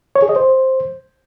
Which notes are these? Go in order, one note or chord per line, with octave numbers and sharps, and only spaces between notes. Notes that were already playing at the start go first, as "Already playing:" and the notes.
C#5
G#4
D#5
C5